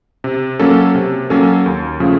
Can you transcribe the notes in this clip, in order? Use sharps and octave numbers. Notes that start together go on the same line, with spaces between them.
C3
F#3 A#3 C#4 A4
C3
F#3 A#3 C#4 A4
D#2
C#3 F3 A3